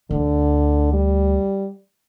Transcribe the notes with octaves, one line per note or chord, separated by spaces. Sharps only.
D2 D3
G3